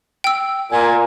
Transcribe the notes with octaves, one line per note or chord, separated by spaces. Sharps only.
G5 E6
A#2 G#5